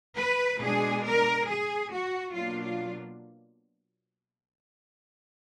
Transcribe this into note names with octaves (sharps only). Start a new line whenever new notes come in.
B4
B2 G#3 D4 G#4
A#4
G#4
F#4
B2 F#3 A#3 D4 F4
F4